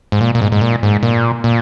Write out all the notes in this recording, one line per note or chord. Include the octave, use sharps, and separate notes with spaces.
G#2
A#2
A#2
G#2
G#2
A#2
G#2
A#2
A#2